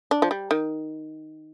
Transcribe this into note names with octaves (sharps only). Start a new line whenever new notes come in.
D4
F3
G3
D#3